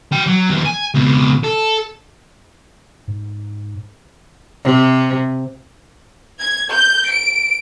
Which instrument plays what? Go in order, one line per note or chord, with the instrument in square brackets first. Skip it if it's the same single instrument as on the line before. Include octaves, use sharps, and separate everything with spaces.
[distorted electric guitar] F#3 G5
F#3
D#2 E3
G#5
C#2 B2
A4
[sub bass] G#2
[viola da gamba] C3
[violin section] G#6
G6
D7